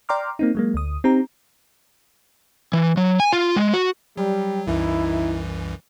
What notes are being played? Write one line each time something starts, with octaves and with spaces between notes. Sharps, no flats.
D5 G5 A#5 C6 D6 F6
A#3 C4 D#4
F#3 G#3 A#3
D2 D#6
C4 D#4 G4 A#5
E3
F#3
G#5
F4
G#3
F#4
F#3 G3
C2 F#2 E3 D#4 E4